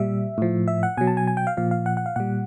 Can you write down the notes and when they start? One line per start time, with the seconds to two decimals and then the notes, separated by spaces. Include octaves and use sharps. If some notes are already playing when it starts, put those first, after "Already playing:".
Already playing: A#2 G3 E5
0.38 A2 F3
0.68 E5
0.83 F#5
0.97 B2 F#3 G#5
1.07 A5
1.17 G#5
1.27 G#5
1.37 G5
1.47 F5
1.57 A#2 F3 F5
1.71 F5
1.86 F#5
1.97 F#5
2.06 F5
2.16 A#2 G3 F#5